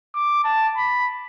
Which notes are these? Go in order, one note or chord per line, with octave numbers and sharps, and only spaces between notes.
D6
A5
B5